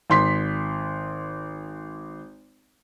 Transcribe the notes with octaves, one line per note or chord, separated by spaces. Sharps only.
G#1 C6 B6